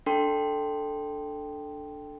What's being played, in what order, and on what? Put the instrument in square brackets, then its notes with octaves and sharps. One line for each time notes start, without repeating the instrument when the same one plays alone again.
[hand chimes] D4 A4 G5 C6